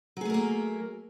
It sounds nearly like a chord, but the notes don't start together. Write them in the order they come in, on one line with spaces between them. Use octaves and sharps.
F#3 G#4 A3 A#4 A#3